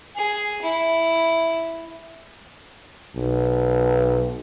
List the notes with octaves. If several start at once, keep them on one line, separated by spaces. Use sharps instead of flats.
G#4
E4
B1